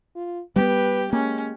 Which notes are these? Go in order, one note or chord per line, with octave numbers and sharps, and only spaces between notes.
F4
G3 A3 B3 G4 B4
G#3 A#3 C#4